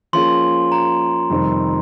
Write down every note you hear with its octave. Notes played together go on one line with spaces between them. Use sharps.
F3 A#3 C#4 F4 G#4 C6
A#5
F2 C3 D#3 G3 C4